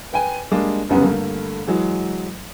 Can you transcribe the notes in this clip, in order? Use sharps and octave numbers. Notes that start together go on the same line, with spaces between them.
B4 G5 G#5
G3 G#3 A#3 D4
F1 C2 F#2 C#3 B3
G2 D3 A3 A#3
E3 F#3 G#3